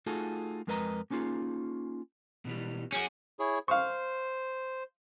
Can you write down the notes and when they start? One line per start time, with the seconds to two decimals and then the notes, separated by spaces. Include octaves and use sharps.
0.06 A3 D#4 F4 F#4 G#4 A4
0.67 F2 G#3 A#4 B4 D#5 A#5
1.10 A#3 C#4 D#4 F4 G#4
2.45 B2 E3 G3
2.92 C#4 F#4 G#4
3.39 E4 G#4 C#5
3.68 C5 F5 C#6